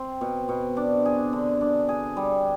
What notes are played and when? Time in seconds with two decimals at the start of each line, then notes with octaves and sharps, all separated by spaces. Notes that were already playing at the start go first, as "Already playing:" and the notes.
Already playing: C4
0.21 B2
0.49 B2
0.77 D4
1.05 G#4
1.33 D3
1.61 D4
1.89 G#4
2.17 G3